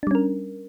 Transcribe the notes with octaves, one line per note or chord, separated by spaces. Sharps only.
G3 C#4 D4 A#4